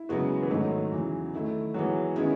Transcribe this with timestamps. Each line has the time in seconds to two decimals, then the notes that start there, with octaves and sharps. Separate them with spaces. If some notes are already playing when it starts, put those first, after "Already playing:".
Already playing: E4
0.09 C#3 F#3 G#3 B3 F#4
0.43 E3
0.50 G#2 D#3 F#3 A3 D#4
0.92 E2 C#3 E3
1.33 D#3 A3 E4
1.74 E3 F#3 G#3 B3 F#4
2.16 D#3 G#3 B3 C#4 E4